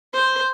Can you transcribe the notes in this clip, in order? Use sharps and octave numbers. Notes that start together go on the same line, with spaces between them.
C5